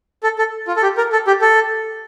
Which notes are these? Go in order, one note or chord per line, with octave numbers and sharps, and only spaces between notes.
A4
A4
F4
A4
G4
A#4
A4
G4
A4